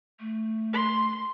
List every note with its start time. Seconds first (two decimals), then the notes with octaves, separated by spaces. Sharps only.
0.19 A3
0.73 C6